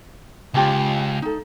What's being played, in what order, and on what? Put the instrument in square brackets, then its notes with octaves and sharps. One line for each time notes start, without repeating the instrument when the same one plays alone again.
[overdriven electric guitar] C#2 [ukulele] F4 G4 A5
[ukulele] D#4 A4